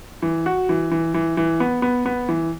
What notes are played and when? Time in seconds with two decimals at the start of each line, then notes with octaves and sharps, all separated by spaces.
0.22 E3
0.46 F#4
0.69 E3
0.91 E3
1.14 E3
1.37 E3
1.60 B3
1.82 B3
2.06 B3
2.29 E3